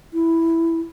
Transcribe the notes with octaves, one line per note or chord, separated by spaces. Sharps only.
E4